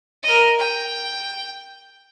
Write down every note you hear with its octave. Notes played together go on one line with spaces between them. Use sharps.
A#4 D#5
G5